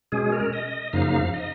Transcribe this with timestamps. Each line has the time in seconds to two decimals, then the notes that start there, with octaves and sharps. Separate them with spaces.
0.12 B2 G#3 C#4 G#4
0.32 A#4
0.53 D#5
0.93 F#2 C#3 F3 A#3 D#4 F5
1.34 D#5